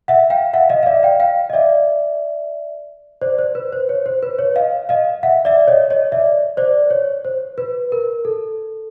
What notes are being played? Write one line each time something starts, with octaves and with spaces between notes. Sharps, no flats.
E5 F#5
F5 G5
E5 F#5
D#5 F5
F5
D5 E5
F5 G5
F5 G5
D#5
D5 E5
C5 D5
C5
B4
C5
C#5
C5
B4
C#5
D#5 F5
D#5 F5
E5 F#5
D5 E5
C#5 D#5
C#5 D#5
D5 E5
C5 D5
C#5
C5
B4
A#4
A4